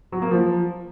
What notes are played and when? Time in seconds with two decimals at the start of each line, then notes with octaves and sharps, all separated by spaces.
0.12 F#3
0.22 A#3
0.31 F3